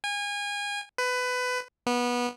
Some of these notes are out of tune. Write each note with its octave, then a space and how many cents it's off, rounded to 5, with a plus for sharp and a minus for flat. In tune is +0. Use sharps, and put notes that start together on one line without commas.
G#5 -30
B4 +20
B3 -20